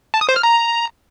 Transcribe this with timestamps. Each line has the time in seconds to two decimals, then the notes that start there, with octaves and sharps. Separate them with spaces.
0.14 A5
0.21 D#6
0.29 C5
0.36 F6
0.43 A#5